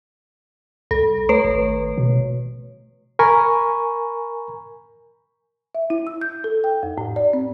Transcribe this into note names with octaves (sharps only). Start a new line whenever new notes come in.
C2 A4
A3 B4 C#5
G#1
B2
A#4 G#5 A#5 B5 C#6
E5
E4
E6
G6
A4
G5
F2
A2
D5
C4